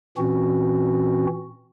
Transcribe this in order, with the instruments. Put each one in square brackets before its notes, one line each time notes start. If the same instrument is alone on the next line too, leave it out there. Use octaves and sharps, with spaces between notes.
[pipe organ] A#2 E3 C4 C#4 F#4